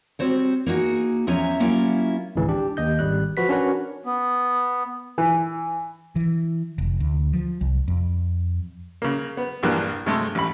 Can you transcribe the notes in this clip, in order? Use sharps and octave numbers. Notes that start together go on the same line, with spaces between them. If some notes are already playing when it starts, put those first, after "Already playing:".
G3 C4 F#4 C5 C#5
A#3 D#4 F#4 G#4
E2 F3 C#4 E5 G#5 A#5
F#3 A#3 C#4 E4 F4
G#1 C#2 E3
D4 G4
D#2 D#5 G6
G#1 G3 F#6
F3 F#4 B4 B6
C#4 D4 F#4 A#4 B4 C#5
B3
E3
E3
F1
D2
F3
C2
F2
C#3 A#3
B3
A#1 G2 E3 A#3 D4 F#6
G2 C3 G#3 A3
A1 B5